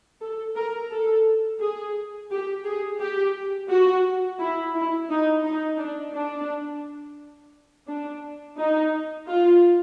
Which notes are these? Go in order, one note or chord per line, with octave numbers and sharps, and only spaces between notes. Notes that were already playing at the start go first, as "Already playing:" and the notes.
A4
A#4
A4
G#4
G4
G#4
G4
F#4
E4
E4
D#4
D#4
D4
D4
D4
D#4
F4